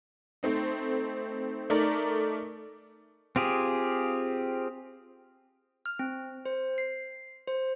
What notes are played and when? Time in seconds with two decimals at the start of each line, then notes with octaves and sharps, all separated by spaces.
0.43 A3 C4 D#4
1.70 A3 D#4 A#4 D5
3.36 C4 F4 G4 G#4
5.86 F6
5.99 C4
6.46 C5
6.78 C7
7.48 C5